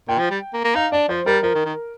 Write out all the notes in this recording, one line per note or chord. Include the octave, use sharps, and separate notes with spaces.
A#2 G5
F3
G3
A#3
A#3
D#4 F5
D4 D5
F3 C5
G3 A#4
F3 A#4
D#3
D#3